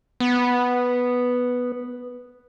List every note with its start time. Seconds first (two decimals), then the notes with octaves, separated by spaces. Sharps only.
0.20 B3